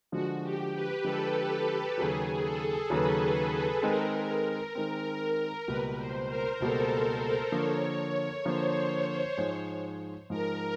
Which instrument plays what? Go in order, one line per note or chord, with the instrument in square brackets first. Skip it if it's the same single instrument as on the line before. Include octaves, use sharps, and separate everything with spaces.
[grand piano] D3 F3 G#3 [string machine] F#4
[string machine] G4
B4
[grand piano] D3 F3 G#3 [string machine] A4
[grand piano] D#2 C#3 F#3 [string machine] G#4
[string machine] A4
[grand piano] D#2 C#3 F#3 [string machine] B4
[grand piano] D#3 G#3 C4 [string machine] A#4
[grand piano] D#3 G#3 C4 [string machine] A#4
[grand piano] C#2 B2 G3 A#3 [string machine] B4
[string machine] C5
A#4
[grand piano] C#2 B2 G3 A#3 [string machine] A4
[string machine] C5
[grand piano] D3 F3 A#3 [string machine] C#5
[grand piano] D3 F3 A#3 [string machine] C5
[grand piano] G#2 F3 G#3
[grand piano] G#2 F3 G#3 [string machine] A#4